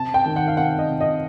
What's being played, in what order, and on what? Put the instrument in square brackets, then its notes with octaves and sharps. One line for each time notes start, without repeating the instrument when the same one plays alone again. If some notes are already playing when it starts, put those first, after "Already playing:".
Already playing: [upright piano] C3 A5
G5
D#3
F#5
F5
C3 F#5
D#5
C3
D#5